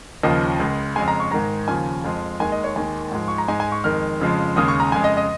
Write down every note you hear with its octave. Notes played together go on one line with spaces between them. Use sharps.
D#2 C#3 F3 D#5
C#2 C#3 G#3
F2 C#3 G#3 G#5
A#5
C#6
G#2 D#3 G#3 A#5
D#2 C#3 F3 G#5
F2 F3 G#3
D#2 D#3 G#3 G#5
D#5
C#5
D#2 D#3 G#3 G#5
G#2 F3 G#3
C#6
A#5
G#2 G#3 G#5
G#5
C#6
F2 D#3 G#3 F6
F2 C#3 F3 G#3
D#2 C#3 G#3 D#6
C#6
A#5
F2 C#3 G#3 G#5
D#5
D#5